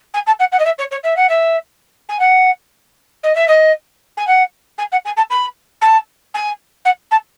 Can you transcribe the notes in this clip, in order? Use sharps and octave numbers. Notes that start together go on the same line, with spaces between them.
G#5
A5
F#5
F#5
D#5
E5
C#5
C#5
E5
F#5
E5
G#5
F#5
D#5
E5
D#5
G#5
F#5
G#5
F#5
G#5
A5
B5
A5
G#5
F#5
A5